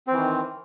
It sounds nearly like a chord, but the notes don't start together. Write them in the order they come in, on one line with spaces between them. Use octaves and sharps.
C4 E3 D#3